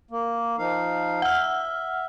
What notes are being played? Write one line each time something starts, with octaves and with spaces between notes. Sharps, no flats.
A#3
F3 D#4 F5
E5 F#5 F6